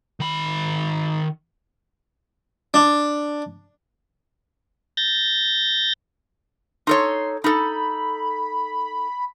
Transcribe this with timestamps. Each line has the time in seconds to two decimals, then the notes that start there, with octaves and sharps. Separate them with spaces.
0.20 D#3 B5
2.74 D4
4.97 G6 A6 A#6
6.87 D#4 A4 C#5 C6
7.44 D#4 A4 B5